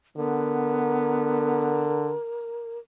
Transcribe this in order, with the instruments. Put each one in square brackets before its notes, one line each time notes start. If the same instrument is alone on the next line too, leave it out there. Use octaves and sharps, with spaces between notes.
[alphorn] D3 [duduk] B3 [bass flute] A#4